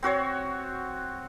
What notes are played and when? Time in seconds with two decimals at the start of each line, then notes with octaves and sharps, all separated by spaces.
0.03 C4 F#4 C5 C#5